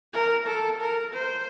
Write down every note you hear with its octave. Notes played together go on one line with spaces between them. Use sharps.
A#4
A4
A#4
C5